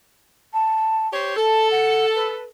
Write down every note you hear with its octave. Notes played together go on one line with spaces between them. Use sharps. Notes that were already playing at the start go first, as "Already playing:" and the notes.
A5
G4 C5 C#5
A4 A5
F#5
B4